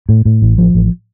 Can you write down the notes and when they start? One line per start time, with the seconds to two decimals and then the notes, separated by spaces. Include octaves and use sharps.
0.09 A2
0.25 A2
0.42 A1
0.58 F3
0.75 A1